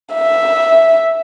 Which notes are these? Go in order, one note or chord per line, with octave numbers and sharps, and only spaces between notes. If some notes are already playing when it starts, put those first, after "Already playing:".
E5